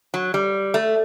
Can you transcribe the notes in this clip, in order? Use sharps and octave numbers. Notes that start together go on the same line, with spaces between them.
F#3
G3
A3